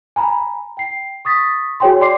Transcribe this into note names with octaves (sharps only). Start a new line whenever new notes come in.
G#5 A#5 B5
G5 C7
C#6 D#6 A6 B6
F#4 G#4 C#5 G5 G#5 C6
D5 C6 D6 C7